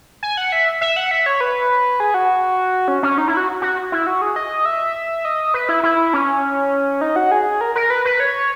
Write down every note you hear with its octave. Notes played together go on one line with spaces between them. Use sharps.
G#5
F#5
E5
E5
F#5
E5
C#5
B4
G#4
F#4
C#4
C#4
D#4
E4
F#4
F#4
E4
F#4
G#4
D#5
E5
D#5
B4
E4
E4
C#4
D#4
F#4
G#4
A#4
A#4
B4
B4
C#5